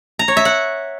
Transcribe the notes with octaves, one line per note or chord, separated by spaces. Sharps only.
A#5
C#5
E5
F#5